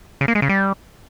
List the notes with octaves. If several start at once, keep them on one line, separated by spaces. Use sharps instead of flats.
C#3
A#3
G#3
C#3
G3